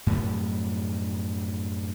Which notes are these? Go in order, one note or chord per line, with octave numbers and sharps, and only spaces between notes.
F#2 A2 C3 F3